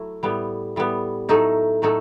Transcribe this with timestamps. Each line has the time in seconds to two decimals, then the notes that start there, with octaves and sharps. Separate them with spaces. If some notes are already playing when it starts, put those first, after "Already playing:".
Already playing: F#3 A3 E4
0.23 A2 G3 B3
0.76 A2 G3 B3
1.29 A2 F#3 A3 D#4 A4
1.82 A2 F#3 A3 D#4 A4